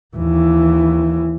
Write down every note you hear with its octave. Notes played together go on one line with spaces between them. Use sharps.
D#2 E3